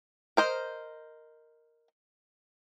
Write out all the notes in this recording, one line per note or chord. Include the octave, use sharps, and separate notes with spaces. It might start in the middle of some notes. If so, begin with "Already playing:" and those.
A#4 C5 D#5